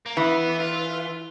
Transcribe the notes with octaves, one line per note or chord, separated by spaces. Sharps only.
A#3
E3 B3
F4